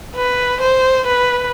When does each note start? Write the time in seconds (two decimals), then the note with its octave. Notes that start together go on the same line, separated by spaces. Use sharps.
0.16 B4
0.61 C5
1.06 B4